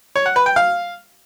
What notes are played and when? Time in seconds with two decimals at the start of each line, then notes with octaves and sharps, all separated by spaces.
0.16 C#5
0.26 F#5
0.36 B4
0.46 G5
0.56 F5